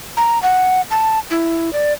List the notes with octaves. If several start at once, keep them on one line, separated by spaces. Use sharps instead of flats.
A#5
F#5
A5
E4
D5